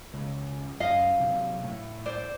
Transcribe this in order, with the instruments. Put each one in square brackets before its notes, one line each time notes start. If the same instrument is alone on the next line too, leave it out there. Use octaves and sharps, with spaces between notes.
[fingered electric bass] C#2
[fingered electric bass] F#2 [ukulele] D#5 F5
[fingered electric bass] C3 F#3
A2
[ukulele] C5 D5